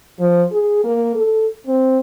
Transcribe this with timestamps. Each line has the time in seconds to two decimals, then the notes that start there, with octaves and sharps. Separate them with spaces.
0.19 F3
0.52 G#4
0.84 A#3
1.15 A4
1.66 C4